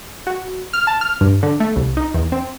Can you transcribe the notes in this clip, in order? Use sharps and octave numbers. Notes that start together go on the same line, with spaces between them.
F#4
F6
A5
F6
G2
D3
A3
C2
D#4
E2
C4